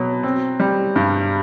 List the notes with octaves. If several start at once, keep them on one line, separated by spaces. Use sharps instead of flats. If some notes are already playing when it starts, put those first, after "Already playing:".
Already playing: B2 F#3
C4
G3
G2